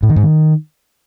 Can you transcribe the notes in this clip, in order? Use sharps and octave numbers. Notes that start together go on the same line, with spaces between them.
A2
D#3
G#2
D#3